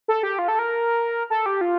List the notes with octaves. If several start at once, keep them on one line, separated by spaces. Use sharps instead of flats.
A4
G4
F4
A4
A#4
A4
G4
F4